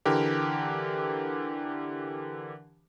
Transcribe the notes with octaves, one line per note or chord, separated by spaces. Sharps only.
D3 E3 G4 A#4